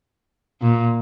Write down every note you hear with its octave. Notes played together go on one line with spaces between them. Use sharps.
A#2